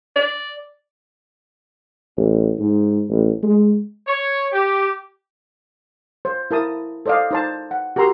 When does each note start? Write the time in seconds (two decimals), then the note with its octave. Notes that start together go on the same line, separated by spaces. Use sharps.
0.16 D5
2.17 A1
2.59 G#2
3.09 A1
3.43 G#3
4.07 C#5
4.53 G4
6.25 C5
6.51 E4 A#4 A5 D#6
7.06 A4 C5 D5 D#5 F5
7.31 D#4 C5 A5
7.71 F#5
7.96 F#4 G4 A#4 A#5 C6 E6